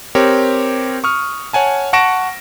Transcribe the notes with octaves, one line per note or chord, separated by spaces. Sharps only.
C4 G4 A#4 C#5
C#6 D#6 F6
C#5 F#5 G#5 A5
F#5 A5 C#6 A#6 D7 E7